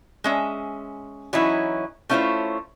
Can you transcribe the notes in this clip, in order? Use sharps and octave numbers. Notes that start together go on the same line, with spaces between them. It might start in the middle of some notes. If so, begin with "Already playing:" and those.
G#3 C#4 E5
E3 F#3 C#4 D#4 E4
A3 C#4 E4 F4 C5 C#5